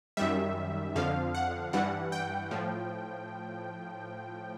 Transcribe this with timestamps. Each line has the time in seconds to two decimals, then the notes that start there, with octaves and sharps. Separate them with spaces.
0.17 F#2 D#3 G3 E5
0.96 F2 D3 F3 F5
1.35 F#5
1.73 G2 E3 G3 F#5
2.12 G5
2.51 A2 F3